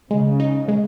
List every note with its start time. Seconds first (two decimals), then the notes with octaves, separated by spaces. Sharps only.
0.10 C#3 G#3
0.40 D#4
0.68 G#3